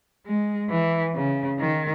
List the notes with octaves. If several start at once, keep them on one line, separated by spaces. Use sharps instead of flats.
G#3
E3
C#3
D#3